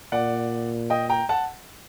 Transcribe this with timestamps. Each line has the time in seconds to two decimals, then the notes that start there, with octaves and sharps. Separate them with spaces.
0.12 A#2 D5 F#5
0.90 D#5 G5
1.09 G5 A#5
1.29 F#5 A5